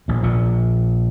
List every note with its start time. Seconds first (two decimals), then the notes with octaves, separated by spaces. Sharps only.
0.08 A#1 A#2
0.23 A#1 A#2